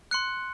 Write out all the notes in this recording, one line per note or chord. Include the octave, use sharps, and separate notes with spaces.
C6 F#6 C#7